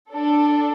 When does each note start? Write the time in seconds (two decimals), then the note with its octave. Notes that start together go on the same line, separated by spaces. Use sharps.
0.11 D4 A4